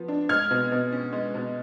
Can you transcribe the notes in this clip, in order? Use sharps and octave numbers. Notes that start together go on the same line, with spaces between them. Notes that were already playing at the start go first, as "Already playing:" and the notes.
Already playing: F3 B3
D4
G#3 F6 G#6
B2
B2
C#4
G#3
B2